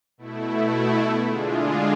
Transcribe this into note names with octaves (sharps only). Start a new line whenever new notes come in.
B2 A3 E4
D3 G#3 D4 F4 G#4